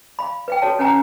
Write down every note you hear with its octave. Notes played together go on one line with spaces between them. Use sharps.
F5 B5
B4 F5 G5
F#4 A4 C#5 A5
C#4 B4 F#5 G#5 A#5